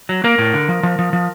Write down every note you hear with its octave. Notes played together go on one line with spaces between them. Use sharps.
F#3
A#3 A#4
A2
D3
F3
F3
F3
F3